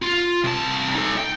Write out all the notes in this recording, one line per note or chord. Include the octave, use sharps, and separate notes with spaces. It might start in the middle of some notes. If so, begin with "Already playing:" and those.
F4
C2 A5
D#4 A4
G5